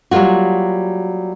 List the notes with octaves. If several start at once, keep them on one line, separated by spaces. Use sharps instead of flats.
F#3 G3 A#3 F4 F#4